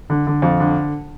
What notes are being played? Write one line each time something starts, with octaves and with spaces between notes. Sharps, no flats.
D3
D3
F2
D3